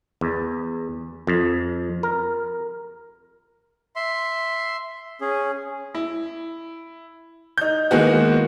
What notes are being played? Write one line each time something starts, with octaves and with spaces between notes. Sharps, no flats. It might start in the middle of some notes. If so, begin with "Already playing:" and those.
E2
F2
A#4
E5 C6
C#4 G#4
E4
D#4 G6
D#3 E3 G#3 A#3 B3 F#4